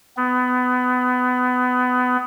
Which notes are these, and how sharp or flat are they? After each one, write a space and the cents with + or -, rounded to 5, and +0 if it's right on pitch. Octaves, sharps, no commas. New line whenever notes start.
B3 +25